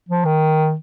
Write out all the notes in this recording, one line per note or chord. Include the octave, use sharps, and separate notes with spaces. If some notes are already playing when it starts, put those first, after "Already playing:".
F3
D#3